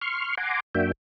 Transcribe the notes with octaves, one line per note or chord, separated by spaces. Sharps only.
C6 C#6 F6
F#5 G#5 A#5 C6 D6
F#2 A#3 D4 F#4 E5 G5